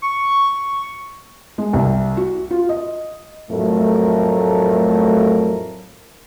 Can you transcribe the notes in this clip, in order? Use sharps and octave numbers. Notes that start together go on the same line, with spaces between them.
C#6
G#3
C2
F#4
F4
D#5
F2 A2 F#3 A3 A#4